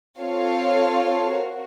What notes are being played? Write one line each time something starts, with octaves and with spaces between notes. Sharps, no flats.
C4 F4 A4 C#5 F5
F#4 A#4